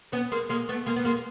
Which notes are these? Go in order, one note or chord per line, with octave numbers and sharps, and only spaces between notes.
B3 C#4
G#3 A#3
G#3 A#3
A3 B3
G#3 A#3
B3
G#3 A#3